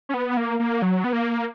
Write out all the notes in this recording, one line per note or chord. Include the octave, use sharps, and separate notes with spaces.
C#4
B3
A#3
A#3
F#3
B3
A#3